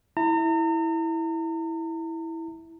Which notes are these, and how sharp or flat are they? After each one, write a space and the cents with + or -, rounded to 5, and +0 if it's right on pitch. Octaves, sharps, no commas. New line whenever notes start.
E4 -10 A#5 -40